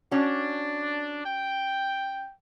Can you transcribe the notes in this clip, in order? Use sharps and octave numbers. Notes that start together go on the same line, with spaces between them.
C#4 D4 F#4
G5